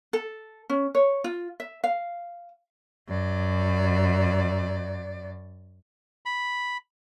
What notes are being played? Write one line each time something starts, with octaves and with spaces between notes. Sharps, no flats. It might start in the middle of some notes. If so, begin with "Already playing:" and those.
A4
C#4
C#5
F4
E5
F5
F#2 D5
B5